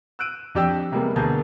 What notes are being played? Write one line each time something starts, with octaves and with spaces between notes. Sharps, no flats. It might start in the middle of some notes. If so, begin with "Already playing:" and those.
E6 F#6 D7 D#7
F2 D4 G4 D5 G5 E6
C3 G3 G#3 A#3 B3
D2 B2 A#3 G#4 A5 G6